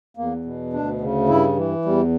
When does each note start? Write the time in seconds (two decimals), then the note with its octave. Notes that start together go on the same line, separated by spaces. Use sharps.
0.17 E2 A#3
0.45 B2
0.73 D2 D4
1.01 C#3
1.28 G2 E4
1.56 E3
1.85 E2 G3